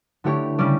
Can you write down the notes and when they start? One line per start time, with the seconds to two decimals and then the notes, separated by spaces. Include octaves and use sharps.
0.24 D3 A3 E4 G4 C#5
0.58 C#3 G3 C#4 G4 D5